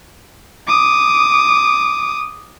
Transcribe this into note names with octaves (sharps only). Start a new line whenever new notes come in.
D6 D#6